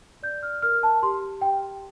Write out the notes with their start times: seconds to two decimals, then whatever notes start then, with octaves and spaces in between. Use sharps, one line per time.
0.23 D5 G6
0.43 F6
0.62 A#4 F6
0.83 A5
1.03 G4 C6
1.41 G4 G5